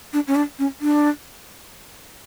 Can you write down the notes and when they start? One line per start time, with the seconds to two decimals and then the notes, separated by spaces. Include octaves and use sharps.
0.13 D4
0.27 C#4
0.35 D4
0.59 C#4
0.81 D4